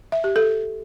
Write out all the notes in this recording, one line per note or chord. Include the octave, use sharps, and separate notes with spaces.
E5
G4
A4